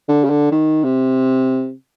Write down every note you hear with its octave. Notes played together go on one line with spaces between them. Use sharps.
D3
C#3
D3
D#3
C3